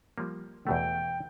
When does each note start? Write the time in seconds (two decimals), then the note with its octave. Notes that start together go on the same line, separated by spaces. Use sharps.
0.18 F3 G3 A#3
0.67 E2 B2 A3 G5